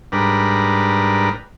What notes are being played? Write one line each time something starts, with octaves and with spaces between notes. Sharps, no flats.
G#2 G3 D4 A#4 B4